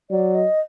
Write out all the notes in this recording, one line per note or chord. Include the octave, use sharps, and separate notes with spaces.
F#3 D5
D#5